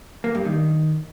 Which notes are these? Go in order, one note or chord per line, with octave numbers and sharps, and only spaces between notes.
A#3
G2
D#3